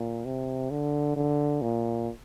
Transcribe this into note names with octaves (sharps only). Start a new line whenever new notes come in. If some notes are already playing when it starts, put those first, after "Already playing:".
Already playing: A#2
C3
D3
D3
A#2